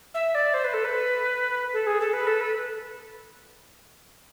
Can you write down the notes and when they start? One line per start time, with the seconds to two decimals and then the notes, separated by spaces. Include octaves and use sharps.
0.14 E5
0.35 D5
0.54 C5
0.64 B4
0.74 A4
0.84 B4
1.73 A4
1.86 G#4
2.01 A4
2.13 B4
2.27 A4
2.40 B4